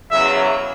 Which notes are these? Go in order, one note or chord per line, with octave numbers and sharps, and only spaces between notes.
E2 C#3 F#3 E5